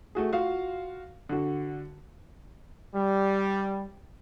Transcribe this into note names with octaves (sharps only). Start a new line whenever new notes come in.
A3 F#4 G#4
F4 F#4 F5
D3 F#4
G3